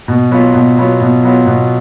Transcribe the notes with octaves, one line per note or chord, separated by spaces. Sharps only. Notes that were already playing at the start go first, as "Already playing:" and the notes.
B2
F#3 B3 F4
B2
F#3 B3 F4
B2
F#3 B3 F4
B2